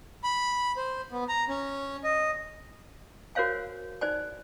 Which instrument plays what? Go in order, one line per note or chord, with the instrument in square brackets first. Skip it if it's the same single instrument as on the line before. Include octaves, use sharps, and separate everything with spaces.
[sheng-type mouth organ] B5
C5
B3
A#5
C#4
D#5
[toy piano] F#4 A#4 C5 C#5 F5 G#5
D#4 C5 D5 G#5